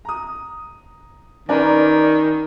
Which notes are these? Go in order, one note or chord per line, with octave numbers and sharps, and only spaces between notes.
A#5 D#6
D#3 C#4 A#4 B4 D5